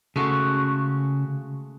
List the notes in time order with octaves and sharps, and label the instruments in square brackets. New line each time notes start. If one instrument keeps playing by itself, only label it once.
[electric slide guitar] C#3 [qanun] G#3 A3 F#4